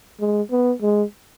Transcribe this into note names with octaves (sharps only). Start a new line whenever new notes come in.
G#3
B3
G#3